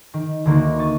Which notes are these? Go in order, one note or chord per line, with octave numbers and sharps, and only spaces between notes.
D#3
D2 D3 D#3 A#3
C#6 D#6 A6